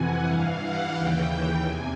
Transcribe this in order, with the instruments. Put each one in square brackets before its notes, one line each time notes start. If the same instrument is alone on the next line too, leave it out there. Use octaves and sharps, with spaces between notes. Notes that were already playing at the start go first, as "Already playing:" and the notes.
Already playing: [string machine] F2 C3 E3 F#5 G#5
G2 E3 F5
F#5
D#2 C#3 E3 G5
G5
E2 C3 G#5